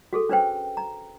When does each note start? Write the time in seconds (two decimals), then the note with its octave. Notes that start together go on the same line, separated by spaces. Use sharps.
0.13 F#4 G#4 A4
0.29 C#4 D4 B4 C5 G5
0.77 A#5